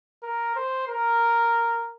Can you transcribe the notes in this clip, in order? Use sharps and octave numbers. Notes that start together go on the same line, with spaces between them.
A#4
C5
A#4